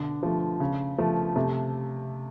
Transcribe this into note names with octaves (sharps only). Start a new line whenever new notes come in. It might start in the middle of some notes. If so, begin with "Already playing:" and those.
Already playing: B2 D3
F3 A3
C#3
F3 A3
C3 A3